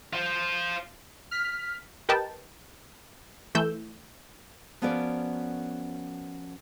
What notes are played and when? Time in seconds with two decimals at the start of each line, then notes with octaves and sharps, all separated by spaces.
0.13 F4 C5
1.31 F6 B6
2.09 G4 A#4 B4 D#5 G5 A5
3.55 E3 A3 E6 G6
4.82 F3 B3 C#4 F#4 A#4 D5